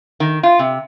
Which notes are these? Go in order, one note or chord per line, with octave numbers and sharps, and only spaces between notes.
D#3
F4
C3